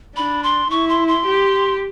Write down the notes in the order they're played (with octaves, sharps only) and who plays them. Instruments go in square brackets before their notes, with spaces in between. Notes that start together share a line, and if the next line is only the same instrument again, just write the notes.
[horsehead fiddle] D4 [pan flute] B5
[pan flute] C6
[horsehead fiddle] E4 [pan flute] C#6
[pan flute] C6
C6
[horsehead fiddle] G4